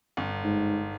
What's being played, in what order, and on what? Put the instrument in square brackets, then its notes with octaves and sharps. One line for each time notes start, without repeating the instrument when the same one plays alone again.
[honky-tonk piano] G1
[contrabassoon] G#2